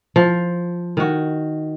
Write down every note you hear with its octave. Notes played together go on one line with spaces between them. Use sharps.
F3
D#3 F#4